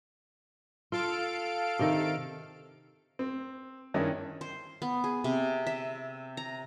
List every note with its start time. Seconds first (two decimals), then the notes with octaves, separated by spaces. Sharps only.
0.92 F4 A4 F5 D7
1.79 C3 D#3
3.19 C4
3.94 G2 D#3 C#4 E4
4.41 C5
4.82 B3
5.04 G#4
5.24 C3
5.67 E5
6.37 A#5